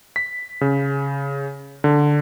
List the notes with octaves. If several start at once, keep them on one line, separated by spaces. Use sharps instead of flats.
B6
C#3
D3